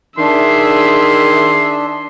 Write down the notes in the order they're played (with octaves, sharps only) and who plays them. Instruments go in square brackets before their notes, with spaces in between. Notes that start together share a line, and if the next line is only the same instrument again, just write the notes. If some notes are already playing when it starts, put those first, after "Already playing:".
[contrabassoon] D#3 [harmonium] D4 [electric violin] G#4 E5 [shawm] C6